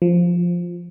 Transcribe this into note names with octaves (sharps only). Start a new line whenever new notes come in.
F3